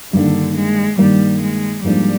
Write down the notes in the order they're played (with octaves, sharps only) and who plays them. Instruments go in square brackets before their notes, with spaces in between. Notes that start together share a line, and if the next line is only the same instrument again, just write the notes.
[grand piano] G2 D#3 A#3 [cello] D3
[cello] G#3
[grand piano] G2 D#3 A#3 [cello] G3
[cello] G#3
[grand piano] G#2 F3 A#3 D4 [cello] G3